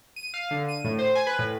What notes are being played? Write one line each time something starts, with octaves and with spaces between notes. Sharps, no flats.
D#7
F5
D3
D#7
A2
C5
G#5
B4
A2